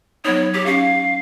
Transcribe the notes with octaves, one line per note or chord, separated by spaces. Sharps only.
F#3 B3 D#4 C#5
G4
C#4 F5